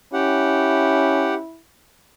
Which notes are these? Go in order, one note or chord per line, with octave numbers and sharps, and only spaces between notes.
C#4 E4 G4 F#5